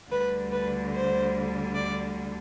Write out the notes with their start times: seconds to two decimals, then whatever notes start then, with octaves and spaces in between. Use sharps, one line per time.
0.11 D2 D3 G3 B4
0.52 B4
0.94 C5
1.76 D5